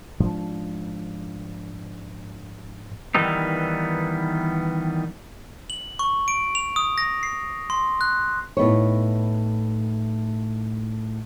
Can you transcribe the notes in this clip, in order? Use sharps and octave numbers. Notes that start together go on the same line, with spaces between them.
G#2 F3 D4
D#3 E3 G3 B3 D#4
F#7
C#6
D7
F7
D#6
A#6
C7
C6
F#6
A2 B3 D#4 C#5